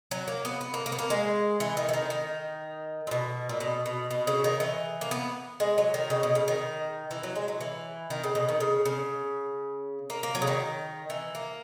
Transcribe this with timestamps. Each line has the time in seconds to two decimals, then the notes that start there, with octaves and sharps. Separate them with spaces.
0.11 F#3
0.28 A#3
0.45 B3
0.61 B3
0.74 A#3
0.86 A#3
0.92 B3
0.99 A#3
1.10 G#3
1.60 E3
1.77 D#3
1.89 E3
1.94 D#3
2.10 D#3
3.07 A#2
3.11 B2
3.49 A#2
3.60 B2
3.86 B2
4.11 B2
4.27 C#3
4.44 D#3
4.60 E3
5.01 A#3
5.11 B3
5.60 G#3
5.78 F#3
5.94 D#3
6.10 C#3
6.23 B2
6.35 C#3
6.48 D#3
7.11 E3
7.23 F#3
7.36 G#3
7.48 F#3
7.61 E3
8.10 D#3
8.24 C#3
8.35 B2
8.49 D#3
8.60 C#3
8.86 C#3
10.10 A#3
10.23 A#3
10.35 F#3
10.42 C#3
10.47 D#3
11.10 E3
11.35 A#3